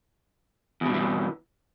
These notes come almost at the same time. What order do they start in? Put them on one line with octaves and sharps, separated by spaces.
E2 B2 G2 E3